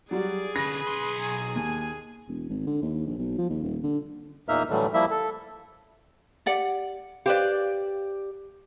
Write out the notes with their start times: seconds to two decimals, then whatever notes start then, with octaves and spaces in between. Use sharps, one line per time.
0.11 F#3 G3 F#4 G#4 D5
0.56 D3 C#4 B4 B5 A#6
0.87 B1 C6
1.18 G#5 A#5
1.56 D#2 G#5
2.28 E1
2.50 G#1
2.67 D3
2.82 D#2
3.06 A#1
3.18 B1
3.38 F3
3.50 D#2
3.63 D#1
3.84 D3
4.49 E2 A#2 A#3 D#4 E5 F6
4.70 A2 D3 E3 F#3 G3 A3
4.94 F3 G3 A#3 E4 E5
5.10 A4
6.46 G4 D5 F#5
7.26 G4 B4 C5 D5 F5